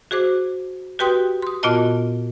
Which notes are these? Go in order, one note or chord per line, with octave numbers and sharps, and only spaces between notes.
F#4 G#4 C5 D6
F#4 G4 B4 G5 C6 D#6
C6 D#6
A#2 B3 F4 F#4 D#5 A5